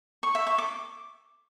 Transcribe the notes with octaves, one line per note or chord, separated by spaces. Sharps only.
C#6
E5
C#6
D6